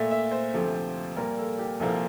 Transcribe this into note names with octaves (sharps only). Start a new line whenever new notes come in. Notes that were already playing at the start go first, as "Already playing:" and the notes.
Already playing: A#2 A3 E5
E5
C5
D2 C3 F3 A3
A#2 G3 A#3 A#4
A4
G4
C2 A#2 F3 A#3 A4